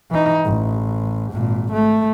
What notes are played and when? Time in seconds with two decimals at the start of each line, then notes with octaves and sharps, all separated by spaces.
0.11 E3 D#4
0.45 A1
1.33 G#1 A#2
1.73 A3